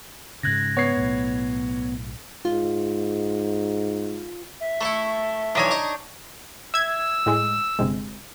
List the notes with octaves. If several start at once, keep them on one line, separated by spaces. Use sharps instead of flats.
G#2 C#3 F#6 G#6 A#6
B3 C#5 C7
B1 A2
G#2 F4
E5
A3 E4 A4 C#6
B1 E3 D4 D#4 C#5 G#5
D#5 A#5 C#6
E5 E6 G#6
A2 G#3
G1 C3 G#3